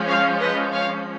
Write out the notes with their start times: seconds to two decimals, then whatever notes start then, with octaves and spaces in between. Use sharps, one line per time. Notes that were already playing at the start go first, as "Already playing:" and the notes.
Already playing: F3 G#3 C#4
0.08 C#5 F5
0.40 B4 D#5
0.73 C#5 F5